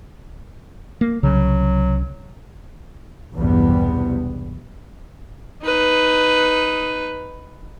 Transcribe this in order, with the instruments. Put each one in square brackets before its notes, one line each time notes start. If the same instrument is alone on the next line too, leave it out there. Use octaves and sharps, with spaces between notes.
[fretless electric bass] A#3
[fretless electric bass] C2 C#3 [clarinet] F#3
[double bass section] B1 E2 G2 C3 G3 B3
[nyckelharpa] D#4 B4